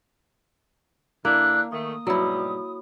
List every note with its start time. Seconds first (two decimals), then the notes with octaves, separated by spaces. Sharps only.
1.25 D3 A#3 D4 E4 F#6
1.72 D#3 A3 D#6
2.07 G#2 B2 F#3 G3 E4